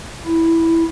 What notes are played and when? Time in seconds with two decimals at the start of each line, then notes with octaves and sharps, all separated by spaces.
0.25 E4